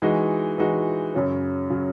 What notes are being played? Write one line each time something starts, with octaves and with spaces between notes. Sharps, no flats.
E3 G#3 D#4 F#4
E3 G#3 D#4 F#4
F#2 C#3 F#3
C#3 F#3